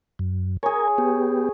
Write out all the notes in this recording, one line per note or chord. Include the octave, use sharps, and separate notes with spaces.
F#2
G#4 A#4 C#5 G#5
B3 G4